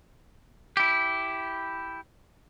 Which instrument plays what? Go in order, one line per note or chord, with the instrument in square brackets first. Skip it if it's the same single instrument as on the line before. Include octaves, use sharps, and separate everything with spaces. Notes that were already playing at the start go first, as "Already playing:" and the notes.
[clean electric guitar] E4 G4